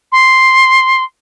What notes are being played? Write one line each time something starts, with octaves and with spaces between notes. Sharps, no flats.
C6